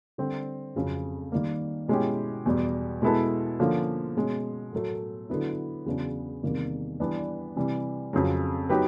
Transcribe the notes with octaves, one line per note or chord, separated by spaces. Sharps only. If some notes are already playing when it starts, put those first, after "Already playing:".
D3 G3 C4
F2 C#3 F#3
D#3 G3 A#3
B2 G#3 C#4 E4 G4
E2 B2 G3
B2 G#3 B3 E4 A4
D3 F3 A#3 C#4
B2 G#3 C#4
A2 F#3 A3
D3 F#3 B3 E4
E2 C#3 F#3 B3 D4
E2 C3 D#3 G3 A#3
E3 G3 B3 D4
C3 E3 G3
F2 C#3 F#3
F#3 B3 D#4 G4 B4